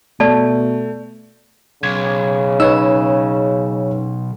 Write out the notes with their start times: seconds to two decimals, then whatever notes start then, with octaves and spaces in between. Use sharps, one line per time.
0.20 B2 A3 D5 A5
1.83 B1 C#3 G#6
2.60 D#4 B4 C#5 E6